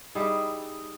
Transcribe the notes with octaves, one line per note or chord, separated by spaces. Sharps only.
G3 D#4 E4 G#4